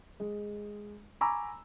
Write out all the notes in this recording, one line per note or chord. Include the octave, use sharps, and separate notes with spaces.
G#3
G#5 A#5 B5 C#6 D6 E6